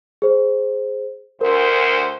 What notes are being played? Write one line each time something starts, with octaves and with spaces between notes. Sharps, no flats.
G#4 C5
D2 A#4 C5